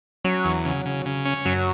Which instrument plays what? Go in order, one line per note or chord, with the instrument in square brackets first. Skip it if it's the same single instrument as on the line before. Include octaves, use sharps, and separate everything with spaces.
[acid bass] F#3 [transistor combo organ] C#4
[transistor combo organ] E2
C#3
C#3
C#3
C#4
[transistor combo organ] F#2 [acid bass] F#3